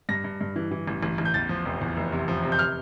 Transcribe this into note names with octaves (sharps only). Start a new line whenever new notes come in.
G2 A#6
G2
G2
E3
E3
A1
A1
A1
G6
E2 A6
F3
F1
E2
F1
C3
F3
C3
G6
F6